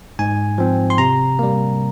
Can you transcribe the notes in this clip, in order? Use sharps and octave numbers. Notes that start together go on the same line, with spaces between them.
G#2 G#5
F3 C4
C6
C3 A#5
G3 A#3